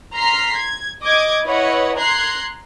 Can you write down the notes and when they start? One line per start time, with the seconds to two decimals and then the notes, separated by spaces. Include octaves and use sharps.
0.13 A#5 C6 F6 B6 C7
0.56 G#6
1.03 D#5 D6 G#6
1.45 E4 B4 C#5 D#5 F#5
1.97 A#5 C6 F#6 G#6 C7